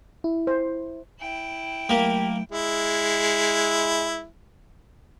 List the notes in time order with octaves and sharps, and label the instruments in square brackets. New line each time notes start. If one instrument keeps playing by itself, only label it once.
[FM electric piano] E4
[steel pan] C5
[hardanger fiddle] E4 G5
[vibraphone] F#3 A3 [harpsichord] A#3 [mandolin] G4
[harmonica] G#3 E4